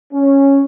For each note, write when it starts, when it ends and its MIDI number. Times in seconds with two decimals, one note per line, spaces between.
0.13 0.62 61